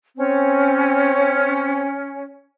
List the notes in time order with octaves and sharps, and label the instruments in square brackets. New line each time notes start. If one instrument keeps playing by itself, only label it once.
[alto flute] C4 [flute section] C#4